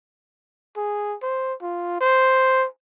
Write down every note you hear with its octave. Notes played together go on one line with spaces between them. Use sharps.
G#4
C5
F4
C5